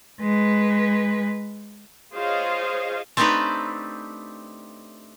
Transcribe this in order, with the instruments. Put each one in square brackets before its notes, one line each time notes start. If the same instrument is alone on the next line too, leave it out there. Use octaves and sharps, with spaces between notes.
[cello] G#3 B4
[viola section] F4 G#4 C5 C#5 D#5 F5
[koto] A3 C4 D4 D#4 G4 B4